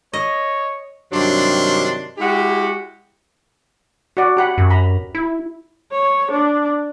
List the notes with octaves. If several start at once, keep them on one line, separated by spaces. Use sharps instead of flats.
C#5 D#5
G2 C3 D#3 F#3 D4 C6
G#3 E4 F#4 G4
F#4 D5
G4 F#5 B5
F#2
A#5 B5
E4
C#5
D4